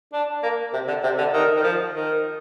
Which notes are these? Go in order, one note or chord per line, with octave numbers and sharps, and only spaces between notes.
D4
A#3
C3
D3
C3
D3
D#3
D#3
F3
D#3